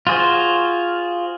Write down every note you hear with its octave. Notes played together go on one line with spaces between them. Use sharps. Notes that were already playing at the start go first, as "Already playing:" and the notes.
F4 F#4 G#4 C5